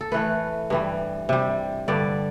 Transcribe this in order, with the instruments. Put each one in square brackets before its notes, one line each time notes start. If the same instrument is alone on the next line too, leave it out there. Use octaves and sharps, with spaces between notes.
[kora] A4
A2 E3 A3 B4
G2 E3 G3
C3 G3
G2 D3 G3 D5